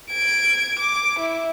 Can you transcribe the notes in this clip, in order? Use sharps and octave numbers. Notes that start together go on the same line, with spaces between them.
G#6 D7
D6
E4